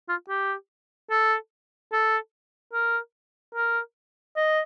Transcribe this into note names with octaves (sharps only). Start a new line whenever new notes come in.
F4
G4
A4
A4
A#4
A#4
D#5